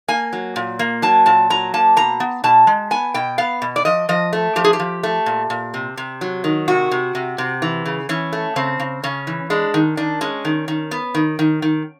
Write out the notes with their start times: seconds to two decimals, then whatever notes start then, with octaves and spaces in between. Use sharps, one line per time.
0.08 A#3 G#5
0.33 F#3
0.56 A#2
0.79 A#3
1.02 F#3 A5
1.26 A#2 A5
1.50 F#3 A#5
1.74 A#3 A5
1.96 B2 A#5
2.20 B3
2.44 B2 A5
2.67 G#3
2.91 B3 G#5
3.14 B2 G5
3.38 B3 F5
3.62 B2
3.76 D5
3.85 F3 D#5
4.09 F3 D#5
4.33 A3
4.56 F3 G4
4.64 G#4
4.73 G4
4.80 F3
5.03 A3
5.26 A#2
5.50 A#2
5.74 C3
5.97 C3
6.21 F#3
6.44 D#3
6.68 C3 F#4
6.91 C3
7.15 C3
7.38 C3
7.62 E3
7.86 C#3
8.09 E3 C#4
8.33 A3
8.56 C#3 C4
8.80 C#3
9.04 C#3 C#4
9.27 E3
9.50 G#3 D4
9.74 D#3
9.97 D#3 D4
10.21 G#3 C#4
10.45 D#3
10.68 D#3
10.91 B3
11.15 D#3
11.39 D#3
11.62 D#3